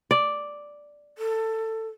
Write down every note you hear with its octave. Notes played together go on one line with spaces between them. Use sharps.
D5
A4